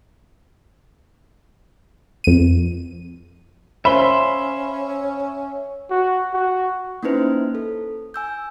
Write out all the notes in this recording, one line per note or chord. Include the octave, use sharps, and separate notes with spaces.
F2 D#7
C#4 C5 E5 F5 B5 C6
F#4
F#4
A#3 C#4 D#4 E4 B4 C5
A4
G#5 E6 G6